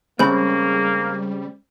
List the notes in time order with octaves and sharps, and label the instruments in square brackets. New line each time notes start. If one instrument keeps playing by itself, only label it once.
[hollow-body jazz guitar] C#3 G#3 C4 [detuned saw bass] G3 [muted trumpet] A#3 [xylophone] B5 G6